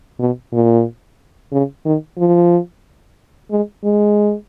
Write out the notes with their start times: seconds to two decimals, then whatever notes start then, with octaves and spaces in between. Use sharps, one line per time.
0.19 B2
0.53 A#2
1.52 C#3
1.85 D#3
2.18 F3
3.51 G#3
3.84 G#3